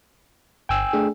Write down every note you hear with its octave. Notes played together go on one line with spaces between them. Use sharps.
G1 G5 G#5 E6
A3 D4 G#4